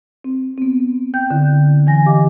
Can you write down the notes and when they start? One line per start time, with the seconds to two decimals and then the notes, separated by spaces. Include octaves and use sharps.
0.24 C4
0.58 B3 C4
1.14 G5 G6
1.30 D3 E4
1.87 E3 G#5 A#6
2.06 G4 D#5 F5 D6